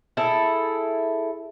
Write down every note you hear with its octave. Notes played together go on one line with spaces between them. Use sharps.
E4 G#4 A4